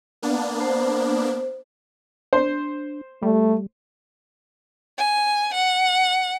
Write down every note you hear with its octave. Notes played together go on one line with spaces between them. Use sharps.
A#3 B3 D4
C5
D4 C5
G3 A3
G#5
F#5